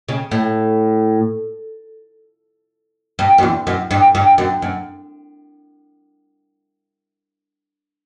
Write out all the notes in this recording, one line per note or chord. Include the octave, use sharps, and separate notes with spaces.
C#3
A2
G2
F#2
E2
F#2
G2
G2
F#2
F#2